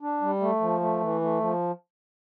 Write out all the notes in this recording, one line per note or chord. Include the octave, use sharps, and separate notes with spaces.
D4
G3
A3
F3
A3
E3
A3
F3